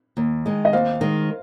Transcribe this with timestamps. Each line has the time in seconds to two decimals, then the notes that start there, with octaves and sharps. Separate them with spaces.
0.17 D#2
0.46 D#3 G#3
0.65 D#5
0.73 D#2 C5 F5
1.01 D#3 G#3